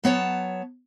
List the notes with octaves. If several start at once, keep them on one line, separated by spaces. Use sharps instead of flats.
F#3 B3 C#5 A5